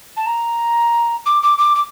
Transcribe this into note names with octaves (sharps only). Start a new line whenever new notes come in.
A5
A#5
D6
D6
D6
D6